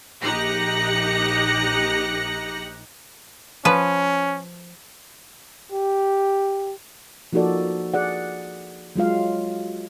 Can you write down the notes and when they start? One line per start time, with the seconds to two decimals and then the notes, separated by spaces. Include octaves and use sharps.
0.24 A#1 D#4 G4 F#6 A#6 C#7
3.65 F3 C#4 B4
5.72 G4
7.33 F3 A#3 D#4 F#4 A4 D5
7.94 G#4 D5 F#5
8.96 F#3 G#3 F4 F5